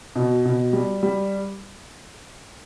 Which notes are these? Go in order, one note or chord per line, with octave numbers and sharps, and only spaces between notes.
B2
B2
G3
G3